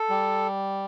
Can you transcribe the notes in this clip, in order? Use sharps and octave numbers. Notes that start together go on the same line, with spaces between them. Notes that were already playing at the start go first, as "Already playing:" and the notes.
Already playing: A4
G3